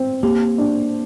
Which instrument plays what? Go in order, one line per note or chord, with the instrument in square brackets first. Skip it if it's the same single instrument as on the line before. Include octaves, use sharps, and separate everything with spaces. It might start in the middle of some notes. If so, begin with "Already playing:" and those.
Already playing: [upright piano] C4
[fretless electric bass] A#3 [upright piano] G4
[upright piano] D4